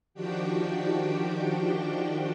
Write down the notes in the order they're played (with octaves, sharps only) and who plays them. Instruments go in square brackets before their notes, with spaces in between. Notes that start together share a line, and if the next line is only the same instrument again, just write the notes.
[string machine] D#3 F3 D4 F#4 G4 G5